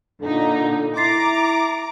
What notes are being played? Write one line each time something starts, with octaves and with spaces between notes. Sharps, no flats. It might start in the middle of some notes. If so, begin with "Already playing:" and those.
A#2 D3 D#4
E4 A#5 C6 D6 A6 C7